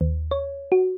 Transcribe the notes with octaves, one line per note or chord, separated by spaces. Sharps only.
D#2
C#5
F#4